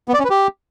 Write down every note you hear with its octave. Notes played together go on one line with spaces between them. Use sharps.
B3
D5
C#4
B4
G4